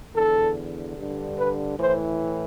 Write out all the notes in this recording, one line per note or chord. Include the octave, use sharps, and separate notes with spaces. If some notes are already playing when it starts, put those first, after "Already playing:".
E2 D3 A4
G2 D3
B4
A2 E3 C5